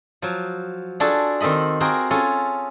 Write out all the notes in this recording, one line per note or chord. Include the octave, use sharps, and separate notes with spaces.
F3 F#3
D4 F4 F#4 G#4 A4
D#3 C4 A4 D#5 B5
C4 F4 F#4 G#4 A#4 G5
C#4 F4 G#4 A4